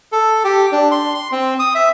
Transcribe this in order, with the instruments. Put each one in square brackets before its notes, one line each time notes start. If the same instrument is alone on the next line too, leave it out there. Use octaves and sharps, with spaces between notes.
[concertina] A4
G4
D4
C6
C6
C4
D#6
E5